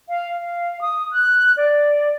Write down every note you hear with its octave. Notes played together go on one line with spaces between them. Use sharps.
F5
F5
D#6
F#6
D5